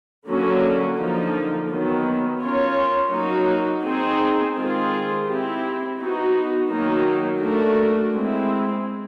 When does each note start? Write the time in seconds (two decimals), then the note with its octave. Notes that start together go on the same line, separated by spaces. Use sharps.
0.26 D3 F#3 A#3 C#4 F#4
0.97 D3 F3 A#3 D#4
1.68 D#3 F#3 B3
2.40 C#4 F4 A#4 C#5
3.12 F#3 A#3 D#4 F#4
3.83 C4 D#4 G#4 C5
4.55 D#3 G#3 C4 F4 G#4
5.26 C4 E4 G4
5.97 B3 D#4 F#4
6.69 D#3 F#3 A#3 D#4
7.40 A3 D4 F#4 A#4
8.12 G#3 C4 E4